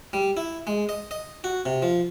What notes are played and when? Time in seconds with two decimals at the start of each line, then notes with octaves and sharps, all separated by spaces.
0.13 G3
0.37 E4
0.67 G#3
0.89 D#5
1.11 D#5
1.44 F#4
1.66 C3
1.82 F3